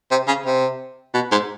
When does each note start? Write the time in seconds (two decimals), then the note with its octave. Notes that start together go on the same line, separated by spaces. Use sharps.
0.11 C3
0.28 C#3
0.46 C3
1.14 B2
1.32 G#2